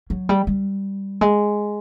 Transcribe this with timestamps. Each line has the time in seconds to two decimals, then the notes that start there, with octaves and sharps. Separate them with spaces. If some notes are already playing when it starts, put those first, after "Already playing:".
0.10 F#3
0.29 G3
0.47 G3
1.21 G#3